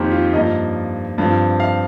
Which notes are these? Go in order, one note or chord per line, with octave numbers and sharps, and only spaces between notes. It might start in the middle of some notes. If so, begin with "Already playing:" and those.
Already playing: F2 D#3 A#3 G4 A#4 C5
F4
G2 F3 A#3 D#5
G2 F3 C4
F5